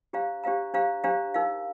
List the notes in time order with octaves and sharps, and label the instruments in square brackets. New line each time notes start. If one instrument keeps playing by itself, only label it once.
[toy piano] D4 G4 C5 F5 A#5
D4 G4 C5 F5 A#5
D4 G4 C5 F5 A#5
D4 G4 C5 F5 A#5
D#4 A#4 F5